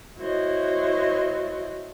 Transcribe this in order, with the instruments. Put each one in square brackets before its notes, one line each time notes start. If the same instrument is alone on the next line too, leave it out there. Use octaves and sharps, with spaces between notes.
[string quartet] E4 F#4 C5 C#5 D#5